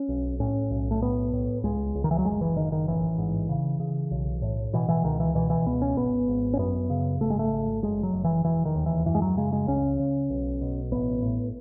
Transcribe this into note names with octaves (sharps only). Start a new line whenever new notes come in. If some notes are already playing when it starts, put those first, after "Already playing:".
Already playing: C#4
B1
A2 C#4
B1
A3
A2 B3
A2
C#2 G#3
C#2
D#3
E3
F#3
F#1 G#3
E3
F#1 D#3
D#3
A1 E3
G#2
C#3
C#3
B1
A2
B2 E3
E3
C#2 D#3
E3
B2 E3
E3
C#2 B3
C#4
G#1 B3
G#1
C#4
F#2 B3
C#3
G#1 A3
G#3
A3
G#1
F#1 G#3
F#3
F#1
E3
E1 E3
D#3
D#2
E3
F#2 E3
G#3
F#3
C#3 G#3
G#3
C#2 C#4
C#3
B1
B2
A1 B3
A2